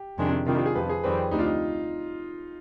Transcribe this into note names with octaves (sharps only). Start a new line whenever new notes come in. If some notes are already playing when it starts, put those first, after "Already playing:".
Already playing: G4
F2 C3 D#3 G#3 D4
C3 D#3 G3 D4 F4
F4
G#4
F2 C3 F3 B4
G#4
F2 D#3 G3 C4 B4
D2 C3 G3 D4 D#4
F4
D#4